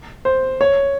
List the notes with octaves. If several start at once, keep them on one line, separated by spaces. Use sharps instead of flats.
C5
C#5